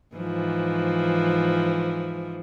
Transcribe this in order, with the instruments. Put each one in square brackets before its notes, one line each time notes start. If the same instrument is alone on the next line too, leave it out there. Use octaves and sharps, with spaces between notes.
[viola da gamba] G#2 E3 F3